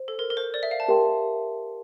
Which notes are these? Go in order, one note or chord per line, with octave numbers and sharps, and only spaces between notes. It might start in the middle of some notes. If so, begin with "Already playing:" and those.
Already playing: C5
A4
A#4
A#4
C5
D5
E5
F5
A5
G4 A#4 E5 G5 C6